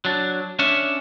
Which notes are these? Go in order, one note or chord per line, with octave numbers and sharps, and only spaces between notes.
F#3 D4
C#4 D4 C#5 E5